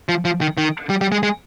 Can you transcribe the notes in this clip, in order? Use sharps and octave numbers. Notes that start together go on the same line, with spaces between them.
F3
F3
D#3
D#3
G3
G3
G#3
G#3